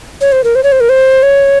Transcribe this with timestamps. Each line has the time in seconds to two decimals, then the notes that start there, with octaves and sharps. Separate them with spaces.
0.21 C#5
0.32 C5
0.44 A#4
0.55 C5
0.63 C#5
0.72 C5
0.80 A#4
0.89 C5
1.23 C#5